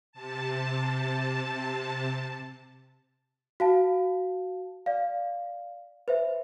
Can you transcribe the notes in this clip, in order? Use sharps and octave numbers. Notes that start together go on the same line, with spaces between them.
C3 A5
F#4 F5 A5
D5 F5
B4 C5 E5